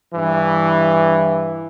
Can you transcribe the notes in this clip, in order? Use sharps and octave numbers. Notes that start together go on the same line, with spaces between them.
G2 E3